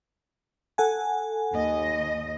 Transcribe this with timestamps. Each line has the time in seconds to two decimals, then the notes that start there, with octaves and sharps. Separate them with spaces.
0.78 A4 F#5 G#5
1.53 D#2 D#5